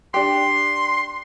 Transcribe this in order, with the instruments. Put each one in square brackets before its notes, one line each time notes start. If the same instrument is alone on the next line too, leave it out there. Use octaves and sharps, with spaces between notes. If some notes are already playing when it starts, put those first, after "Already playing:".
[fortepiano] D4 G4 [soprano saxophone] C6